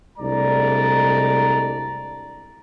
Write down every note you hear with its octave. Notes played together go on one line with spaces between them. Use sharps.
C2 G#3 A3 D4 D5 A#5